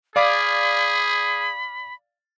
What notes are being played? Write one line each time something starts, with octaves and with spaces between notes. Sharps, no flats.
G#4 D5 F5 B5 D6